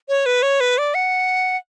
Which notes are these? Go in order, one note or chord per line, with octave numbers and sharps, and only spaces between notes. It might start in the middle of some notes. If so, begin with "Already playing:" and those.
C#5
B4
C#5
B4
D5
F#5